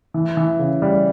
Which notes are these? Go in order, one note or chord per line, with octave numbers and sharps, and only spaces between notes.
E3
E3
C#3
G3